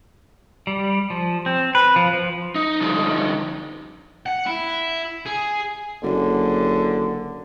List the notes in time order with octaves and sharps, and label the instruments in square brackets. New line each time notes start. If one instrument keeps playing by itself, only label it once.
[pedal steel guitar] G3
F3
C4
B4
F3
F3
[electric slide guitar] D#4
D3 F3 G3 D#4
[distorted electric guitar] F#5
E4
G#4
[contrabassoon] F#1 [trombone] D3